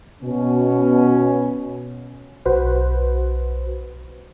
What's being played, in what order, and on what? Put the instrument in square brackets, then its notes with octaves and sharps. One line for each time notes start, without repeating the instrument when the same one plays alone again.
[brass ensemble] B2 C#4
[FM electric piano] B1 F#4 B4 C5